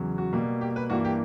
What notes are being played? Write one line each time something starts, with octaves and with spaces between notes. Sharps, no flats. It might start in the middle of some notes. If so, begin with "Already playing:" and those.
Already playing: E2 C#3 F#3
F#4
B2 G3 A#3
G4
B4
G2 E3 A#3 F#4
G4